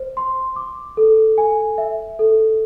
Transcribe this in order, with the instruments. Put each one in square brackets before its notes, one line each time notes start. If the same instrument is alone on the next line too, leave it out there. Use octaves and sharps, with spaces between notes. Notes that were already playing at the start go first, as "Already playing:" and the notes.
Already playing: [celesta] C5
C6
D6
A4
G#5
E5
A4